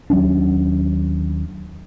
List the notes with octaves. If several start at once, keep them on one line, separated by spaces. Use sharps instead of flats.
D#2 F#3 C#4 D4